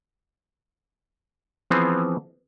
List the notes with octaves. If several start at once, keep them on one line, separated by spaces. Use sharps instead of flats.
E3 F3 B3 C4 G#4